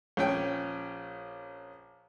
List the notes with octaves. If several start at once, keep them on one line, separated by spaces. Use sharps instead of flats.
A#1 C#4 G5